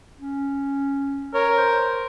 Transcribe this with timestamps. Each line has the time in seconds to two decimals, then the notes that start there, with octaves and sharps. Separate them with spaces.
0.20 C#4
1.34 A#4 C#5
1.58 C5